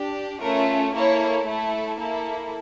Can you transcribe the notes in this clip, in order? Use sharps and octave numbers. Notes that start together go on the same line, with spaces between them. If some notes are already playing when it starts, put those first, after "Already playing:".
Already playing: D4 G4
A3 C#4 F4 A#4
A#3 E4 A4 C#5
A3 E4 A4
A#3 E4 A4